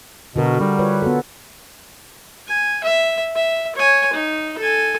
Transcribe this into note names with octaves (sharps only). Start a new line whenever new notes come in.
B2 D3 F#4 A#4
G3 D4
F4 B4 C#5
B3 F#4 A4
G#5
E5
E5
C#5 G#5
D#4
A4 G#5